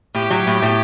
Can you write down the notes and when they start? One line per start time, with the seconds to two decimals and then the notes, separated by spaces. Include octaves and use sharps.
0.15 A2 G4
0.30 F#3
0.47 A2
0.62 A2